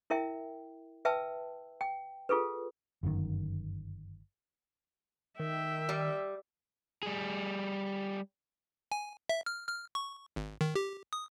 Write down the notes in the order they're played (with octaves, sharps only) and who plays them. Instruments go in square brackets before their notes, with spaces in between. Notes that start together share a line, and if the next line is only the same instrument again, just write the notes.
[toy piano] E4 A#4 E5 G5
B4 E5 G5 A5 E6
G5
F4 G#4 A4 B4
[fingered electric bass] G1 F#2 D3 D#3
[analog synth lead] D#3 [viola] E5 G5
[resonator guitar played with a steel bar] G3
[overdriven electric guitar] G3 G#4
[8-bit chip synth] G#5
E5
F6
F6
C#6
G#1
D#3
G4
D#6